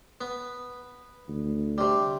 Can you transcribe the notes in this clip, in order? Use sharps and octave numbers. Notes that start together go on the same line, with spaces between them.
B3
D2
C3 G3